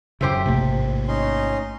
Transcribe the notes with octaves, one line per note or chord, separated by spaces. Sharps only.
F#2 C#3 G4 C5 E5
A1 G#2 C3 A3 A#3
C#4 D#4 C6